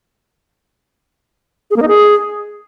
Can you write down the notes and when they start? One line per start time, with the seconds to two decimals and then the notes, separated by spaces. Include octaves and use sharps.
1.71 G#4
1.76 A#3
1.82 D#4
1.88 G#4